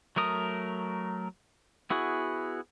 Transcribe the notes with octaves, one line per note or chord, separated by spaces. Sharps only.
F#3 A3 A#4 D#6
B3 E4 F#4 G#4